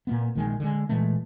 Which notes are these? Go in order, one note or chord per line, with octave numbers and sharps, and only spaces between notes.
A#2 A#3 B3
A#1 D#3 G#3
D3 G#3
A#2 E3 G#3 A3